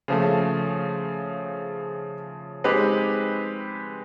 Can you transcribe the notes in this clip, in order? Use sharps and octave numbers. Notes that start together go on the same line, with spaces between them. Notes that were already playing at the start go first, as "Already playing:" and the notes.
C#3 F3 A3
G#3 C4 D#4 G4 B4